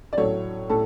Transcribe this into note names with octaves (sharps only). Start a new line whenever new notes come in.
D5
A2 F#3 A3 C#5
A2 A4